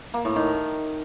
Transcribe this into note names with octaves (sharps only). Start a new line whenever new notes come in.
A#3
A2
D#3